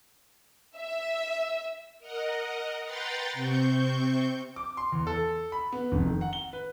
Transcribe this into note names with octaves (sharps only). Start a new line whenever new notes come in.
E5
A#4 D#5 F#5
B4 F#5 G5 A#5 C6 A6
C3 C4 C#6 G6
D6
C6
E2
A4
B5
B3
F1
D#3
F#5
G7
B4